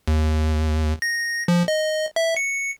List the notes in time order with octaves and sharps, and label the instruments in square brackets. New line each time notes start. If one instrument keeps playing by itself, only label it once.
[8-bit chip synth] D#2
A#6
F3
D#5
E5
C#7